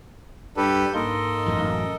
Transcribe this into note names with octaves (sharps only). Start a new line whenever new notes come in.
G2 G3 D4 G4 A4 B4
G#2 A#3 A4 A#4 D#5 C6
A1 F#2